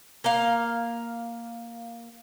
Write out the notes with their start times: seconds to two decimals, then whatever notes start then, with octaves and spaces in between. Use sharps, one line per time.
0.24 A#3 F5